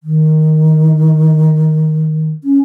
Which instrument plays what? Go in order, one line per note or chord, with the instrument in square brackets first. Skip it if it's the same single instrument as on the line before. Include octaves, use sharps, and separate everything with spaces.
[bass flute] D#3
C#4